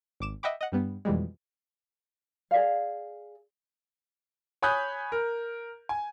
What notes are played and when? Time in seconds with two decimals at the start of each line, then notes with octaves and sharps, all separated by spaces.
0.20 G#1 D6 E7
0.43 D#5 E5 F#5 G5 B5 D6
0.61 D#5 F#5
0.72 G2 G3 B3
1.05 F2 B2 E3 G3 G#3
2.51 G#4 D5 F5
4.62 C#5 G#5 B5 D#6 F#6 G6
5.12 A#4
5.89 G#5